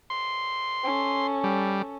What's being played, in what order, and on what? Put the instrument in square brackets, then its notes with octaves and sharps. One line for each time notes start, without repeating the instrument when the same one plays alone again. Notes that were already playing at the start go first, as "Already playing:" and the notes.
[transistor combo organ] C6
[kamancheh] C#4 A4
[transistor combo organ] G3